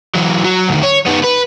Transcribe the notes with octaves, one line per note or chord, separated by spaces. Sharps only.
E3 F#3
F#3
D2 D#3
C#5
D#3 B3
B4